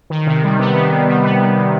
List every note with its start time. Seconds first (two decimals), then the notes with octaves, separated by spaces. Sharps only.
0.10 D#3
0.27 C3
0.44 G3
0.59 B3
0.75 D#3
0.91 C3
1.08 G3
1.23 B3
1.40 D#3
1.56 C3